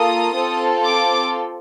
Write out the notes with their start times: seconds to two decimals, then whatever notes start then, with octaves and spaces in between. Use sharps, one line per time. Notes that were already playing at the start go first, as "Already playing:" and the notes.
Already playing: A#3 F4 A4 D#6
0.37 C4 F4 A4
0.85 D6